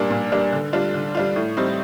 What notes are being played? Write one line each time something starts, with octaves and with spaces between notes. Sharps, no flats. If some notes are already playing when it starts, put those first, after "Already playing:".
Already playing: A#2 G3 A#3 D4
A#2
G3 A#3 D4
D3
G3 D4 F4
D3
G3 D4 F4
A2
G3 C4 D#4